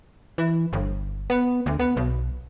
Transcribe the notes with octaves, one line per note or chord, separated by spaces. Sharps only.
E3
G1
B3
D2
B3
B1